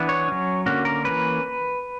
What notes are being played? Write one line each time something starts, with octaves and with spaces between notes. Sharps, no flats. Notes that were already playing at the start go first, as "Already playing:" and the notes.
Already playing: E3 B3 D4
C#5
F#3 C#4
D3 A#3 C#4 F#4
A#4
E3 A#3 C#4 B4